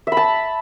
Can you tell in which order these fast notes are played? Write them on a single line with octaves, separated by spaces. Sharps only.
E5 B5 A5